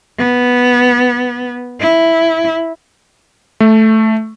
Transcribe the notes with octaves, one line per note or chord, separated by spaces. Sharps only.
B3
E4
A3